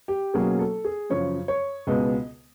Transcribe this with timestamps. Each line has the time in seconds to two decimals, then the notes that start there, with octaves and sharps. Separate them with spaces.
0.08 G4
0.34 B2 F#3 A#3 C#4 G#4
0.59 A4
0.85 G#4
1.10 F#2 C#3 F3 C#5
1.48 C#5
1.87 C#2 B2 G#3 B3 D#5